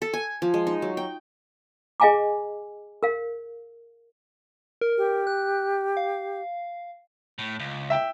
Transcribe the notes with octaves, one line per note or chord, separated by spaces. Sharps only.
A4
G#5
F3
G#3
D#4
F#3
G5
G#4 D#5 F5 G#5 A#5 D6
A#4 F5
A#4
G4
F#6
F5
A2
C#2
E5 G5